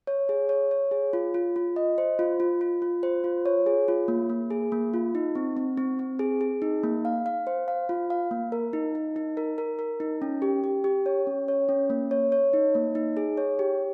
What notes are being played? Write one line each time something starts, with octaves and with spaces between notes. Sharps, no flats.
C#5
G#4
C#5
C#5
G#4
F4
F4
F4
D#5
C5
F4
F4
F4
F4
C5
F4
C#5
G#4
F4
A#3
A#3
G#4
A#3
F4
D#4
C4
C4
C4
C4
G#4
G#4
D#4
A#3
F5
F5
C5
F5
F4
F5
A#3
A#4
D#4
D#4
D#4
A#4
A#4
A#4
D#4
C#4
G4
G4
G4
C#5
C#4
C#5
C#4
A#3
C#5
C#5
D#4
A#3
D#4
G#4
C#5
G4